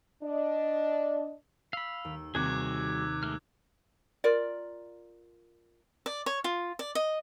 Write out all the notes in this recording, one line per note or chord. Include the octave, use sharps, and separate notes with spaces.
D4 D#5
F5 B5 E6
D#2
D#2 C3 G3 F#4 G#4 D6 F#6 G#6
G#3 A3 F6
F4 A#4 D5
D5
C#5
F4
D5
D#5